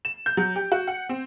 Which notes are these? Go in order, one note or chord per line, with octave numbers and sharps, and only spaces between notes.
E7
G6
F#3
G4
F#4
F#5
C4